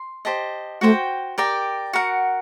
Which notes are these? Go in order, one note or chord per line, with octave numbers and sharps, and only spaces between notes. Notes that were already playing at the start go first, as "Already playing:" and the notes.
Already playing: C6
G4 C5 D#5 A5
A3 F#4 C5 G5
G4 A#4 D5 G5
F#4 A#4 F#5